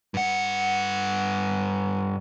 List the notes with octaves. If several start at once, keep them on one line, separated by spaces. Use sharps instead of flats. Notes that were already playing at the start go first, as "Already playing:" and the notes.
G2 F#5